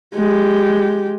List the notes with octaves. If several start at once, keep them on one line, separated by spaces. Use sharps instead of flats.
G#3 G4